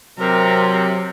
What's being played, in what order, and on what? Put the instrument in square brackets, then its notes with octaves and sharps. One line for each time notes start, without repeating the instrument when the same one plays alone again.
[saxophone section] C3 [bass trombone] F#3 [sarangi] A#4